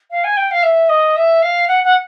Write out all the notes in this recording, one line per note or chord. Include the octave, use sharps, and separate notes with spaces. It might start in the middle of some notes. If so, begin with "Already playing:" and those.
F5
G#5
G5
F5
E5
D#5
E5
F5
F#5
F#5